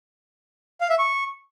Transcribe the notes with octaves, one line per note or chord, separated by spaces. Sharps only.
F5
E5
C#6